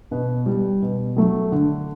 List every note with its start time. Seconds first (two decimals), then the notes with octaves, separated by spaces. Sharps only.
0.11 B2 B4
0.46 G3
0.82 B2
1.17 F#3 A3
1.52 D3